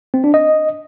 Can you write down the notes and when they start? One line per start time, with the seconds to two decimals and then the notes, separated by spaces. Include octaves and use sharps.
0.14 C4
0.24 D4
0.34 D#5